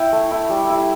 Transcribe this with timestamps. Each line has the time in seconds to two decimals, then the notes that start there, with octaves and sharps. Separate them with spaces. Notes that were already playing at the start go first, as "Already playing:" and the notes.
Already playing: E4 G5
0.12 A3
0.31 E4
0.50 G3
0.70 E4